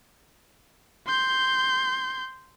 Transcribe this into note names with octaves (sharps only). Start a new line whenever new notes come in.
C6 G6